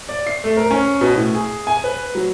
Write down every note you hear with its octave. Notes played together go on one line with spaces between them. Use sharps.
D5
C7
A3
A#4
C#4
B2
A2
G#4
G#5
B4
F#3